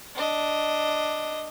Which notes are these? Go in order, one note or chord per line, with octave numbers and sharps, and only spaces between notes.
D4 D#5